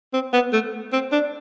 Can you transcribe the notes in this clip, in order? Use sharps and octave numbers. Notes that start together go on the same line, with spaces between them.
C4
B3
A3
C4
D4